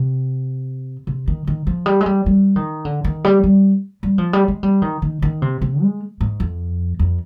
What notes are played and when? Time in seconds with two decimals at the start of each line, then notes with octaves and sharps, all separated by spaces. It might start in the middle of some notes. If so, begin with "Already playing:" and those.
Already playing: C3
1.07 C3
1.28 D#3
1.47 D#3
1.67 F3
1.86 G3
2.01 G#3
2.06 G3
2.26 G3
2.56 D#3
2.85 D3
3.05 D#3
3.24 G3
3.44 G3
4.03 G3
4.18 F3
4.33 G3
4.48 G#3
4.63 G3
4.82 D#3
5.02 D#3
5.22 D#3
5.42 C3
5.62 C3
5.82 G#3
6.21 G#2
6.40 F2
6.99 F2